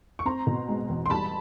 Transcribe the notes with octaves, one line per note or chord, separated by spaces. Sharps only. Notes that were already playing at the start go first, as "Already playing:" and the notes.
C#6
C4 A#5 C6
B2
G#3
E2
C6
G3 A5 B5